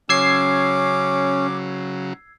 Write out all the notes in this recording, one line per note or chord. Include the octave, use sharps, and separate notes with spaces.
C#3 F#3 C#4 D6 E6 G#6 C7